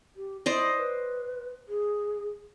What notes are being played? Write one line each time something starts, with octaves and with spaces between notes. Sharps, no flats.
G4
E4 C5 D5 D#5
B4
G#4